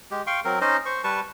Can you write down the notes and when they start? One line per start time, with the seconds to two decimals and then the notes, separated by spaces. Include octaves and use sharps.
0.11 G#3 G4
0.27 F5 G5 C6 C#6
0.45 F#3 C4 A#4
0.61 C#4 D#4 C5 D#5
0.86 C5 C#6
1.04 G3 B4 A5 C#6